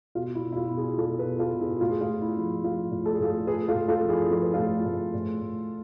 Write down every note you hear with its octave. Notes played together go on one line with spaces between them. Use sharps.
B2 F4
E4
B2
E4
F4
B2
E4 G#4
B2 F4 A4
G#4 B4
B2
F4 A4
B2
E4 G#4
A2 F4
G#4
F4
A2
E4
F3
F3 F4
A2
A4
G#4
A2 F4 A4
A2 G#4 B4
F4 A4
A2
F4 A4
F3
E4 G#4
F3 A4
B4
A2 F4 A4
A2
A2
A2